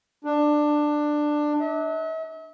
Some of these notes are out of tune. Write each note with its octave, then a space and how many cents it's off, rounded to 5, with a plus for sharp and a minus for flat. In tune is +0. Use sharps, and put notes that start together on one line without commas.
D4 +15
E5 -45